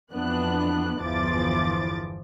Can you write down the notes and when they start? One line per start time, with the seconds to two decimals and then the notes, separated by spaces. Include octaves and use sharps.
0.12 F2 E3 B3 D4 F#6
0.99 G1 E2 E3 F3 D6 A6